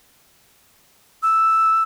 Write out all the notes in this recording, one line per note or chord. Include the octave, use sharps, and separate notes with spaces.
E6